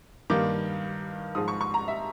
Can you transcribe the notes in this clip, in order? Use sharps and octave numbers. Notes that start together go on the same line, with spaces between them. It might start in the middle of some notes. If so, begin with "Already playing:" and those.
G2 D#3 G3 A#3 D6
G#2 F3 G#3 D#6
C#6
C#6
A#5
E5